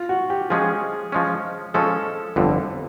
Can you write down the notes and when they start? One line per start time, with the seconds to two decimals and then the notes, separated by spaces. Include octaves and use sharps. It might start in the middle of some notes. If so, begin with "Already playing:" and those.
Already playing: F4
0.09 F#4
0.30 G4
0.50 F3 G#3 C#4 G#4
1.12 F3 G#3 C#4
1.74 F3 G#3 C#4 A4
2.36 G1 F2 D3